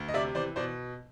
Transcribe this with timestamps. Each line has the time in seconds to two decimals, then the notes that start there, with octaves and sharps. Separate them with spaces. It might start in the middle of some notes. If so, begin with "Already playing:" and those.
Already playing: D2
0.08 D#5
0.14 C3 D5 E5
0.35 E3 C5 D5
0.56 B2 C5 D5